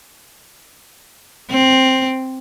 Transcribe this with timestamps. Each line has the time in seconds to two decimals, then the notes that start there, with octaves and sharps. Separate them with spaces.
1.50 C4